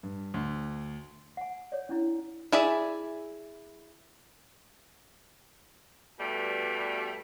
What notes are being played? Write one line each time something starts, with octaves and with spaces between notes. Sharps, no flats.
G2
D2
F#5 G#5
C#5 D5
C#4 D4 E4
E4 G#4 D5 E5
G2 B2 G3 A3